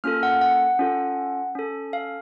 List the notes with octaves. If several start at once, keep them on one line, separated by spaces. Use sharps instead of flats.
A#3 C#4 F4 A4 F6
F#5
F#5
C#4 F4 A4
C#4 A4
F5